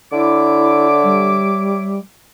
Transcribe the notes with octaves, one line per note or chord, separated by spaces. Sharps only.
D3 E4 C#5 E5 D6
G3